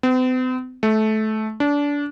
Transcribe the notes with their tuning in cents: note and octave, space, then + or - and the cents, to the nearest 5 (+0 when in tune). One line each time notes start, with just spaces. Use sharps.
C4 -45
A3 -20
D4 -25